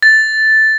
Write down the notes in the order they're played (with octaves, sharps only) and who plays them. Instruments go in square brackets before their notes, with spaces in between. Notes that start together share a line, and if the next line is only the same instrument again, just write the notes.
[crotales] A6